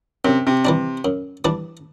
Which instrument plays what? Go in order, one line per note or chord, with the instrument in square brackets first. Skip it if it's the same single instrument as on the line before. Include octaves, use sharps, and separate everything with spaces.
[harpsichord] F#2 [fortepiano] C3
[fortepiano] C3
[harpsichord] E3 G3 D4
F#2
E3 G3 D4